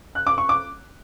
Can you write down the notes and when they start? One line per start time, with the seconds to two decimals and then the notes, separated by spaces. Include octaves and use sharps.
0.15 F#6
0.27 D6
0.38 C#6
0.49 D6